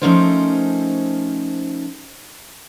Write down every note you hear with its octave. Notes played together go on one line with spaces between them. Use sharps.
F3 A3 C#4 D#4 A#4 C5